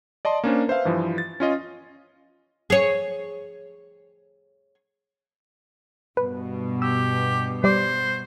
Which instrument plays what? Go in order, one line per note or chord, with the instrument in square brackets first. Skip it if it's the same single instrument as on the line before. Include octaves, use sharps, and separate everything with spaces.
[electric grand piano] D5 D#5 A5 C6
A#3 C#4 D4 C5
B4 C5 E5 F5
G2 E3 F3
A6
C#4 F4 D#5
[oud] G#4 C#5
[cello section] G2 B2 [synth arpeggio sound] B4
[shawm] G4 [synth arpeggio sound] E6
[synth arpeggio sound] G3 D5 D6 [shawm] C5